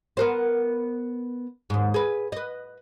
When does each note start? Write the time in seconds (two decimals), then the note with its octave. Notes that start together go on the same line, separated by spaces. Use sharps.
0.17 B3 A#4 C5
1.70 D#2 G#2
1.94 G#4 B4
2.32 B4 D#5